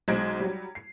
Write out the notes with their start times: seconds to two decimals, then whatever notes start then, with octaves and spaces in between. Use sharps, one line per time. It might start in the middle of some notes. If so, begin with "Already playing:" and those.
0.08 B1 G#3 C5 G#6 A#6 D7
0.40 F#3 G3
0.75 C7